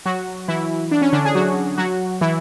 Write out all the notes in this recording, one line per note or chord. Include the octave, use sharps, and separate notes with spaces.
F#3 F#4
E3 E4
D4
C#4
D3 D4
G#4
F#3 F#4
F#3 F#4
E3 E4